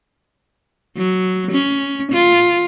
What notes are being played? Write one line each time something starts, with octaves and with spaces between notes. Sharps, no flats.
F#3
C#4
F4